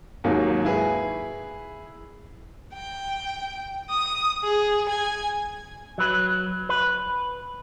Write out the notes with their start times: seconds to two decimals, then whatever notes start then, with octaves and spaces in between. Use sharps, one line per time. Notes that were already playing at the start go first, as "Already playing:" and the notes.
0.24 D#2 G#2 F#3 A#3
0.65 E4 G#4 B4
2.74 G5
3.90 D#6
4.44 G#4
4.89 G#5
5.98 F#3 B4
6.69 B4